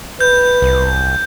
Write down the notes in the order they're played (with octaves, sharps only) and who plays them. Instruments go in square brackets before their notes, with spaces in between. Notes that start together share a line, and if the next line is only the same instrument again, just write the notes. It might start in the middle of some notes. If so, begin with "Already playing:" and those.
[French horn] B4 [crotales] G6
[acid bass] C2